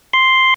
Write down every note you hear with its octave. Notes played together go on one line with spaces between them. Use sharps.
C6